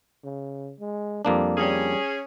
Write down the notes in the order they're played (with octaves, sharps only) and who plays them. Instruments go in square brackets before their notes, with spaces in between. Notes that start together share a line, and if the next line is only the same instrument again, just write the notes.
[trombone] C#3
G#3
[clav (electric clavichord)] F2 A#3 D4 [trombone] G3
[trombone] G3 [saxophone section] C#4 G#4